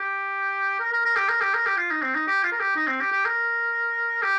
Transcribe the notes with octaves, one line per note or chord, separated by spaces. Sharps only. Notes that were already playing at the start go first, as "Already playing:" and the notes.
Already playing: G4
A#4
A#4
A#4
G4
A#4
G4
A#4
G4
F4
D#4
C4
D#4
G4
F4
A#4
G4
D#4
C4
G4
G4
A#4
G4